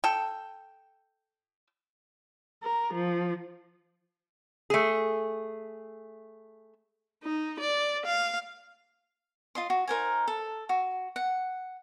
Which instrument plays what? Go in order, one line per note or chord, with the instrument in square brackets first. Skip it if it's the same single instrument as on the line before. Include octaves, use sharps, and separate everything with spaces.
[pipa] A4 G5
[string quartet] A#4
F3
[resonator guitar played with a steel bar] A3 G#4
[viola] D#4
D5
F5
[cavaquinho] F4 D#5 C6
F#4
D#4 A#4 C5 G#5
A4
F#4
F#5